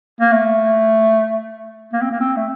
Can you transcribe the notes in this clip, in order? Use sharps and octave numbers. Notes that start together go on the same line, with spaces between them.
A#3
A3
A#3
C4
A#3
C4
A3